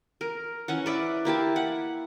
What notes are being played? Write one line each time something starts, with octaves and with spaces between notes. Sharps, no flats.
A#4
E3 C#4 F#5
B4 D5 E5
A#3 E4 G4 A5
F#5